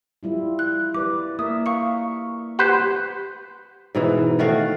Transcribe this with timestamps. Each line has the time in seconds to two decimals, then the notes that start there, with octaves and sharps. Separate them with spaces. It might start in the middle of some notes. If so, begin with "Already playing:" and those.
0.23 G3 E4 F4
0.59 F#6
0.94 G3 B4 D5 D6
1.39 A#3 A#4 E5 D#6
1.66 F5 C#6 C#7
2.59 G4 B4 C5 F#5 G#6 E7
3.95 G#2 B2 E3
4.39 D#3 A3 F#4 F5